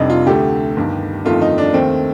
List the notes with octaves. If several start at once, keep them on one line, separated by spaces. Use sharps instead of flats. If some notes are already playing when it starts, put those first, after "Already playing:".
Already playing: F1 F2 C3 G3 D4 D#4
F4
D2 D3 A3 G4
G1 G2 D#3
G1 F2 D#3 A3 F4
D#4
D4
D#2 D#3 A3 C4